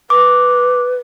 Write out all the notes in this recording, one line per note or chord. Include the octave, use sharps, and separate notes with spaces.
B4 D6